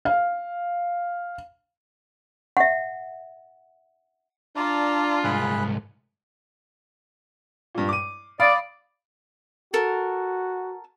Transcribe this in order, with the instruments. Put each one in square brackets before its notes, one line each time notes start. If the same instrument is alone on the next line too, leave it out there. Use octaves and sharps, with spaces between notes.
[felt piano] F5
[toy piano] E5 F#5
[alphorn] D4 [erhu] F4 [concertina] D5 A5 A#5
[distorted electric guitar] C2 G#2 [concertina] G#4 B5 F#6
[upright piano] G2 A#2
D6 D#7
[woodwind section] D5 [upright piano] F5 B5 D#6
[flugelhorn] F#4 [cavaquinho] A4 A#4